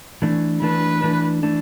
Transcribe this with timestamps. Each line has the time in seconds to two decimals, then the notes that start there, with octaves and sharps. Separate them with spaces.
0.22 E3 A3 D4
0.62 E3 A3 D4 B4
1.02 E3 A3 D4
1.43 E3 A3 D4